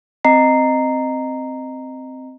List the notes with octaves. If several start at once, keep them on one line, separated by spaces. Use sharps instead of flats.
C4 D#5 A#5 C7